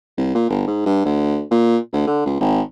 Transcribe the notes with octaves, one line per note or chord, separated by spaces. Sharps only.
C2
A#2
G1
G#2
G2
D2
A#2
D2
D3
C#2
G#1